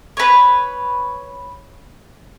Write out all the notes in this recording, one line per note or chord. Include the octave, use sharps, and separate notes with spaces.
B4 C#5